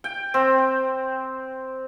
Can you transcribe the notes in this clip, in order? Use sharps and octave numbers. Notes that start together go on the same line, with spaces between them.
G5
C4